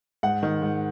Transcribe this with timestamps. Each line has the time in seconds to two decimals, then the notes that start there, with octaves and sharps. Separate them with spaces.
0.23 G#2 F#5
0.43 D#3
0.62 G#2